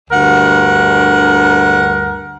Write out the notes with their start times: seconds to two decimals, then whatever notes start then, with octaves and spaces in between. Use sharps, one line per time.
0.10 D2 G2 A#4 F#5